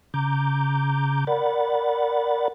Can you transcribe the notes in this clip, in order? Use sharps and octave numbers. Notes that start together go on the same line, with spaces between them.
C#3 A#5 D6 G6
A#4 D5 F#5 B5 A6